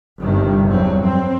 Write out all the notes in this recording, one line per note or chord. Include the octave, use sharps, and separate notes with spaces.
G1 G2 C3 D#3
E2 G2 F#3 C4
F2 C4